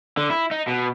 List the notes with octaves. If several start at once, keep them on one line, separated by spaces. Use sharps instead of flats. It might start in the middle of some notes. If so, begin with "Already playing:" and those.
D3
E4
D#4
B2